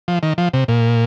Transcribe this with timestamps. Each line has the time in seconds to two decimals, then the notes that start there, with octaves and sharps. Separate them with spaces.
0.08 F3
0.23 D#3
0.38 F3
0.54 C3
0.68 A#2